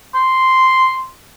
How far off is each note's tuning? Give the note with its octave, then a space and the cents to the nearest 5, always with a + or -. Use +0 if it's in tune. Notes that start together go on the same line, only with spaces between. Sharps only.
C6 -5